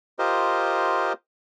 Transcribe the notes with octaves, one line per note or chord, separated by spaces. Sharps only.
F4 G4 A#4 C5 D#5